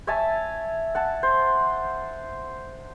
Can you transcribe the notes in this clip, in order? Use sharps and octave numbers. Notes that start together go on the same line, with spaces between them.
C#5 E5 G#5 A5
F#5 A5
C5